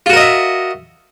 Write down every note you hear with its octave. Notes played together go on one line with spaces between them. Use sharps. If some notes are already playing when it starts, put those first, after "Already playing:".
F4 F#4 A#4 D#5 E5